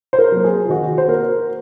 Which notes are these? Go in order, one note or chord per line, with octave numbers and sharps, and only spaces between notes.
C5
A#4
F#3 A#3
G#4
F4
D#3 F#4
C5
A#3 A#4